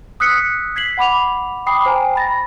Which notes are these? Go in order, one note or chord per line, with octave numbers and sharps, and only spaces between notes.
D#6 E6 F#6 B6 C#7
G#6 B6 C7 F#7
F#5 B5 D6 F7
G5 B5 D6 D#6 C7
C5 G5 G#5 A#5
B5 A6 A#6